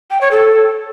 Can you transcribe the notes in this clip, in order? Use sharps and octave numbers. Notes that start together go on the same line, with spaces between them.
G5
C#5
A4